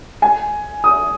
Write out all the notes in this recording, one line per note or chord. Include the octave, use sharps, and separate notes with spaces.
G#5
D#6